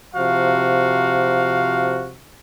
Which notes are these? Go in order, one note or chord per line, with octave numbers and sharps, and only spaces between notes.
C3 F3 F#4 F5